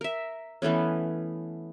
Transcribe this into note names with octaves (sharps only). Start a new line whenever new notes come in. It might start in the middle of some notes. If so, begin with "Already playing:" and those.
A#4 E5
E3 A3 B3 C#4